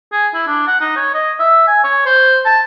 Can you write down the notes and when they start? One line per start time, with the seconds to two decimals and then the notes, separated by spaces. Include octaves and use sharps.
0.12 G#4
0.34 E4
0.47 D4
0.67 F#5
0.81 D#4
0.96 C#5
1.14 D#5
1.39 E5
1.67 G#5
1.84 C#5
2.06 C5
2.46 A5